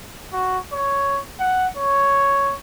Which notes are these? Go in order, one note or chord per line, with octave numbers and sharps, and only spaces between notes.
F#4
C#5
F#5
C#5